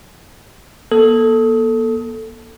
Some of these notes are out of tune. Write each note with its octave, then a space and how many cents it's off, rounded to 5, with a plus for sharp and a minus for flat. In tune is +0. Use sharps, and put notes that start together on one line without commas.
A#3 +45 A4 +5 D#6 +30